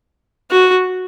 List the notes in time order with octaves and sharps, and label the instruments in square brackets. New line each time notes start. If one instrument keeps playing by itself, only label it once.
[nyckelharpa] F#4